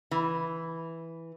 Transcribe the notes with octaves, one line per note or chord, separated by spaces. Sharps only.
E3